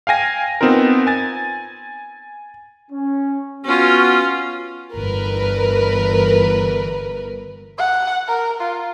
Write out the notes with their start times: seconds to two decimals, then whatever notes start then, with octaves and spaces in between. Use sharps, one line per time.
0.07 F5 G5 G#5 A#6
0.61 B3 C4 D#4 F4 A#4
1.07 G#5 A6
2.91 C#4
3.65 B3 C#4 F4 F#4
4.94 G1 E3 A#4 B4
7.78 F#5
8.28 A#4
8.61 F4